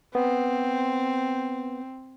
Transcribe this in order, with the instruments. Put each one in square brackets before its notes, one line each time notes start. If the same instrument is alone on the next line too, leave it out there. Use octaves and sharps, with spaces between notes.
[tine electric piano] B3 [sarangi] C4